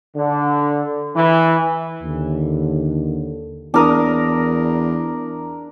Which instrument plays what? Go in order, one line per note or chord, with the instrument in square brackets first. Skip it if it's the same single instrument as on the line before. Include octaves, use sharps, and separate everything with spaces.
[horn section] D3
E3
[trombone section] D#2 D3
[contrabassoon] E2 [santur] D4 A#4 D#6